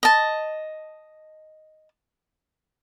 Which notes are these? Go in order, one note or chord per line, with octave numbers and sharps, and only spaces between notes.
D#5 A5